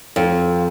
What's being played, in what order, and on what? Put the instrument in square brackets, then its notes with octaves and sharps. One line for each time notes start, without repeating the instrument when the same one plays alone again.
[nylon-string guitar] F2